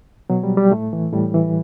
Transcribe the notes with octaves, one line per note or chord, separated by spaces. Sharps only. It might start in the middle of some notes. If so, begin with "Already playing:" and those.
B2 F#3
G3
G3
A2 A3
E3
A2 G3
E3